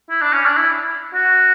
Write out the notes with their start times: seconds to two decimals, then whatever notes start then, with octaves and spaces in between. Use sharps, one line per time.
0.10 E4
0.22 D4
0.33 C#4
0.45 D4
0.57 E4
1.14 F#4